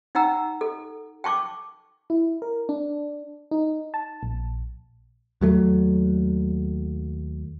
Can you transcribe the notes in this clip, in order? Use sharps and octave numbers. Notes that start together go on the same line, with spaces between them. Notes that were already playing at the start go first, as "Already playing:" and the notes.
D#4 F#5 G5 A#5 E6
A4
G5 A5 C#6 D6
E4
A#4
D4
D#4
A5
A#1
D#2 F#3 A3